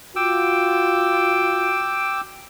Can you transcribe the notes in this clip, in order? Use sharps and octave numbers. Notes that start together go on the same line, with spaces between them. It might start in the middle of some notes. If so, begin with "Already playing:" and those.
F4 F#4 G5 D6 E6